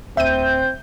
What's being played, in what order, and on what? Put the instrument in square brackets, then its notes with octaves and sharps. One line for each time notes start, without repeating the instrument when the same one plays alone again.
[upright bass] D1 [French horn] C4 [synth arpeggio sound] E5 D#7 [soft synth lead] G6